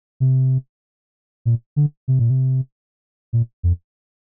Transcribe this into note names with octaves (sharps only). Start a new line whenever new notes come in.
C3
A#2
D3
C3
A#2
C3
A#2
F2